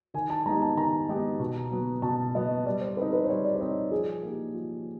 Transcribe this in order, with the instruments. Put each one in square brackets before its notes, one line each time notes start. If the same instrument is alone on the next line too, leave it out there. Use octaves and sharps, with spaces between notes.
[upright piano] D#3 [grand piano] G#5
[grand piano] A5
[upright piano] G#3 B3 D#4 G4 [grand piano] A#5
[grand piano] A5
[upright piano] D#3 [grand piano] A#5
[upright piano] G#3 B3 D#4 G4
B2
F#3 B3
[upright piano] B2 [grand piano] A5
[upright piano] F#3 B3 [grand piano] D#5
[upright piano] G3 [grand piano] D5
[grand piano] C5
[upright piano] C4 D#4 [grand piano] B4
[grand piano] B4
C5
[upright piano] G3 [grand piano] C#5
[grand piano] D5
C5
[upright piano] C4 D#4 [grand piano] C#5
[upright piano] F3 [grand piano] G#4
[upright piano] A#3 D#4 G4
F3